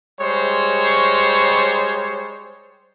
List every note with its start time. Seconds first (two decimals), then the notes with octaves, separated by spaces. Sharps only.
0.20 G3 G#3 C5 C#5